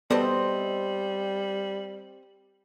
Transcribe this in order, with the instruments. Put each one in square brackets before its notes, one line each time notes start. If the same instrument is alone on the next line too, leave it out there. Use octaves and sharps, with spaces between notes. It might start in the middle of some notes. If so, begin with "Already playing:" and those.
[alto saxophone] G3 [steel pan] B3 A4 D5 [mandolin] C4 C5 D#5